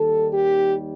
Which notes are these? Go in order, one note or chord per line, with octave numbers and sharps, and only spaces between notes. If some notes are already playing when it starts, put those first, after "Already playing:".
Already playing: D#2 D#3 G3 A4
G4